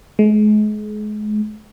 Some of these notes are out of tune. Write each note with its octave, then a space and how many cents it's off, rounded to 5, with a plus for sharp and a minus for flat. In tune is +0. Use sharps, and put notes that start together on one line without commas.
G#3 +35